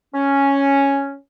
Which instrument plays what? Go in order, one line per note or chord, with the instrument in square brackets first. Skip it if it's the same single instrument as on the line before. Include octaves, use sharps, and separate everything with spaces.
[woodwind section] C#4